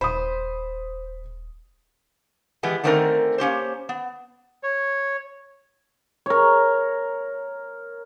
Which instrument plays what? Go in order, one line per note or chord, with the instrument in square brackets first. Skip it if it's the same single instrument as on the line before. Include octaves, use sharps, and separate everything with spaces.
[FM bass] D#1 [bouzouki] C5 [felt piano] B5 D#6
[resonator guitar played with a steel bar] E3 G#3 B3 G4
D3 D#3 A3 C4 C#4 A#4
A#3 C#4 G4 C5
B3
[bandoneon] C#5
[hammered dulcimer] A#4 C#5